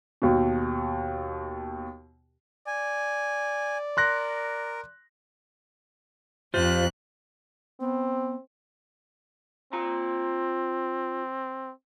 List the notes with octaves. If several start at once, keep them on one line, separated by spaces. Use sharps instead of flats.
D#2 B2
D5 G#5
A#4 C6 F#6 A#6
F2 F4 G4 C5 F#6
B3 C4
C4 F4 A#5